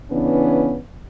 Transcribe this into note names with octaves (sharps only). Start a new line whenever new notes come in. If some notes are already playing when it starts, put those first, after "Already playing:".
C#3 E3 B3 C#4 D4